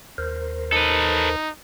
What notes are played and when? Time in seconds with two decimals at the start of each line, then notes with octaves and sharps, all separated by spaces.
0.18 D#2 A#4 C5
0.73 D#4 A4 B4